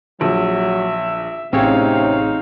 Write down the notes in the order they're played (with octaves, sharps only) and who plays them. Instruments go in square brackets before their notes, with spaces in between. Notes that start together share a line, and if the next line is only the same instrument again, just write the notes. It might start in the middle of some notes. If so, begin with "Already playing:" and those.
[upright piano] A#1 [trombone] F#3 [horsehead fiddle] E5
[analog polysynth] A1 G#4 C#5 [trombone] C3 [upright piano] C4 C#4 [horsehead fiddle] D#4 F5